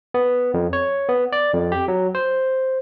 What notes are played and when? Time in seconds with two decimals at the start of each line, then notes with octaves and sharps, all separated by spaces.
0.14 B3
0.54 F2
0.73 C#5
1.09 B3
1.33 D5
1.54 F2
1.72 G4
1.88 F#3
2.15 C5